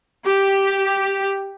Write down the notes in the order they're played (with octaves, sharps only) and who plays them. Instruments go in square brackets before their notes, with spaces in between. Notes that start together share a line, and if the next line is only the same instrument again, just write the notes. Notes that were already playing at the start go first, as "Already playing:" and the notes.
[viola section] G4